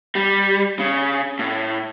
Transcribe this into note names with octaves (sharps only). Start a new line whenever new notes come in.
G3
C#3
A2